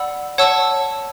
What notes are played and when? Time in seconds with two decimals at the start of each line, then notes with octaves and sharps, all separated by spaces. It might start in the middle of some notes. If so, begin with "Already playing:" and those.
Already playing: D5 F#5 B5 E6
0.38 C#5 F#5 A5 C#6 E6